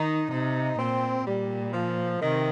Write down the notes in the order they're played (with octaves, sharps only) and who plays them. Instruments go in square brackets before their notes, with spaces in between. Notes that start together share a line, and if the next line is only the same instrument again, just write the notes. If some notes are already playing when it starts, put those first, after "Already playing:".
Already playing: [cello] D#3 [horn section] D#4
[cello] C3 [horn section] D#4
[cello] A#2 [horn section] C4
[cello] A#2 [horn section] G3
[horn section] F3
[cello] C3 [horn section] D#3